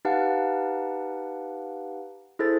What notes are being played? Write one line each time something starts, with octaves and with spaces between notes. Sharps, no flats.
D#4 G4 B4 F5 F#5 A5
E4 G#4 A4 C5 A6